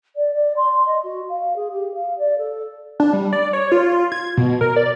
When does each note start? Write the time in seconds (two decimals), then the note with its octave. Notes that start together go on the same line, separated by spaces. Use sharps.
0.16 D5
0.34 D5
0.57 C6
0.86 D#5
1.04 F#4
1.29 F5
1.56 G#4
1.72 G4
1.94 F5
2.18 D5
2.38 A4
3.00 D4
3.13 G3
3.33 D5
3.53 C#5
3.72 F4
4.12 G#6
4.37 B2
4.61 A#4
4.76 D5